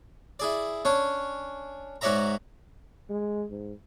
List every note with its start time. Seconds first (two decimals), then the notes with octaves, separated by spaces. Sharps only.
0.39 E4 G#4 D5
0.85 C#4 D4 C#5
2.01 G#2 F#4 C#5 D5 E5 A#5
3.10 G#3
3.51 G#2